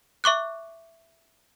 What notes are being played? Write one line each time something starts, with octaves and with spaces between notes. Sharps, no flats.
E5 C#6 D6 F#6